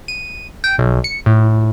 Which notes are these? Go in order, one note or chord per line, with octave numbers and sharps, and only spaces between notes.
D#7
G5
B1
C#7
A2